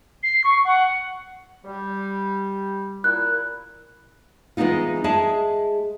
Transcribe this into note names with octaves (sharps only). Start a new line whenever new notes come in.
C7
C#6
F#5
G3
A#2 E4 F#6
E3 G#3 B3 C4 D#4 F4
G#3 G#4 E5 A5